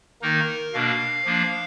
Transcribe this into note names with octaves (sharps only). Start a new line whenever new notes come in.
D#3 A#3 D#4 A#4
B2 A#3 D4 F5
F3 A#3 D4